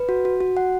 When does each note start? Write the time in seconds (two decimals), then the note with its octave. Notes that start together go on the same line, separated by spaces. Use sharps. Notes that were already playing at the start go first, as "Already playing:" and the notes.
Already playing: B4
0.09 F#4
0.25 F#4
0.41 F#4
0.57 F#5